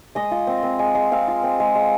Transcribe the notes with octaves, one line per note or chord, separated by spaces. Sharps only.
G#3 D#5
F4
C4
C4
G#3
G#3
C4 F5
F4
C4
G#3
G#3